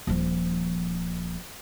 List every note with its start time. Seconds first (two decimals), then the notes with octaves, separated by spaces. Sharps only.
0.07 D#1 F3